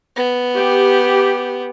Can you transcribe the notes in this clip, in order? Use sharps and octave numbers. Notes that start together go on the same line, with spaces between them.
B3
G4